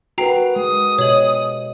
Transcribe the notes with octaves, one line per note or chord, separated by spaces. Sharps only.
F#4 A#4 B4 G5 A#5 C7
G#3 D#6
B2 G4 C#5 D#5 F#7